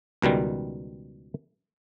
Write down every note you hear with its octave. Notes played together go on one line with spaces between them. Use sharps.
C#2 B2 D#3 G3